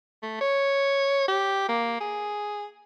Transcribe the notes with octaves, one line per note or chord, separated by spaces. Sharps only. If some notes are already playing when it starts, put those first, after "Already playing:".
A3
C#5
G4
A#3
G#4